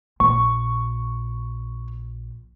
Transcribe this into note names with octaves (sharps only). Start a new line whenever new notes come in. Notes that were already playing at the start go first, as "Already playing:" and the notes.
A#1 C#6